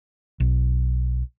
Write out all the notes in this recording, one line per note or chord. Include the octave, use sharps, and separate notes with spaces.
B1